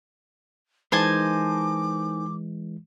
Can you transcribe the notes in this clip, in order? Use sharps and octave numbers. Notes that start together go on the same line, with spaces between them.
E3 G#3 D#4 A#4 C5 G#5 A5 D6